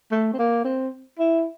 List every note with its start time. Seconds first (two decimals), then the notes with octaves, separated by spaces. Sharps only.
0.11 A3
0.33 C4
0.39 A#3
0.64 C4
1.19 E4